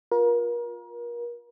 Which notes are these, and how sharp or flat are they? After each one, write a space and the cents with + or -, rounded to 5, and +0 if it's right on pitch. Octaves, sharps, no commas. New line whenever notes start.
F4 +20 A#4 +35